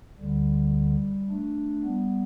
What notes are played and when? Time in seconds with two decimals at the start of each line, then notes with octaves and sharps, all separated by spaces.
0.18 D2 D3 G3
1.29 A3 D4
1.84 G3 B3